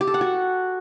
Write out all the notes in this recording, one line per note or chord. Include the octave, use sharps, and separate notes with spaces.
G4
A4
F#5
F#4